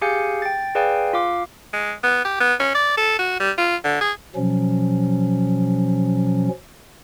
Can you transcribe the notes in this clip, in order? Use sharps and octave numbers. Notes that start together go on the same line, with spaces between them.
G4 G#4 F5 G#5 G6 C#7
G5 A6
G#4 B4 D5 F5 G5 G#5
F4 F5 D6
G#3
B3
G4
B3
C#4
D5
A4
F#4
G3
F4
D3
G#4
B2 F3 F#3 C#4